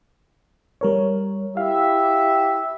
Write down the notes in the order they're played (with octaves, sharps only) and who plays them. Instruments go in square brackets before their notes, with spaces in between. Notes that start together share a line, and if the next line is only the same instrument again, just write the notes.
[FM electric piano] G3 A#4 C#5
[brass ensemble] E4 G4 E5 [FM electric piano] F5